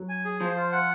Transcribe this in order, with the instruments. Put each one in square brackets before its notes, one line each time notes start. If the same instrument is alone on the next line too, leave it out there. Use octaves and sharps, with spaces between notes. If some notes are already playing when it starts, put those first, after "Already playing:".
Already playing: [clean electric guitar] F#3
[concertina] G#5
G#4
[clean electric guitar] F3 [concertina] C5
[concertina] F4
F#5